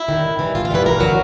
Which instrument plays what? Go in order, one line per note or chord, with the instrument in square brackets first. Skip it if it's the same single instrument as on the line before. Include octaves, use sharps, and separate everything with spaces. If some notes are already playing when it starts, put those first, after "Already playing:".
Already playing: [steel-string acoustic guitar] E4
D#3 G3
A2
E3 G3
A2 F4
F4
E3 G3 B4
G2 A#4
D3 F#3